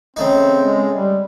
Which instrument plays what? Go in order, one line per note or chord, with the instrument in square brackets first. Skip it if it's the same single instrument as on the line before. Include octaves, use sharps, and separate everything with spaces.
[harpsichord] C#3 A3 D#4 [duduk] C4
[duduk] G#3
G3